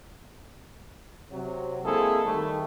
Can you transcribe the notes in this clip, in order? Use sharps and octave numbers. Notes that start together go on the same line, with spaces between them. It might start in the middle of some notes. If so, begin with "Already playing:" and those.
C3 F#3
G#3 A#3 C4 E4 G#4 A4
D#3 G3 A3